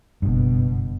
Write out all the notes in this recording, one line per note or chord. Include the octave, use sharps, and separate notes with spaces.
F#1 G2 B2